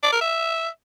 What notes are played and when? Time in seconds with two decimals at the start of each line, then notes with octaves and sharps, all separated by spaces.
0.03 D5
0.12 A#4
0.21 E5